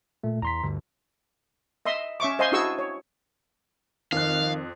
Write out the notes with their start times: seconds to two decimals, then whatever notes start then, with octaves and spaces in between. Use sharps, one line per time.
0.23 A#2 A3
0.42 E2 A#5 C6 B6
0.63 D2 G2 D3
1.86 D#5 E5 C6 D#6
2.20 C#4 E5 C#6 D6
2.39 C5 D#5 F5 G#5 C6
2.52 D4 E4 F#4 G#4 C#6 E6
2.79 C#5
4.12 F2 D#3 F5 F#6